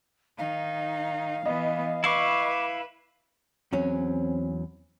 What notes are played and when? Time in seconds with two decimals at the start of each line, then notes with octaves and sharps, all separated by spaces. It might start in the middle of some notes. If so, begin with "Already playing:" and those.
0.38 D#3 D#4 F5
1.46 E3 B3 D#5
2.04 E4 B4 F5 C#6 D6
3.73 E2 F#3 C4 C#4